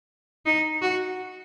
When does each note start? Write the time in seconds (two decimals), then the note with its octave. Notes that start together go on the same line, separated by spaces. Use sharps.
0.46 D#4
0.82 F#4